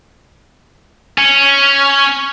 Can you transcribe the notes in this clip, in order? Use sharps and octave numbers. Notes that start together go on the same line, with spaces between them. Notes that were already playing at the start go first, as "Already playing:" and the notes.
C#4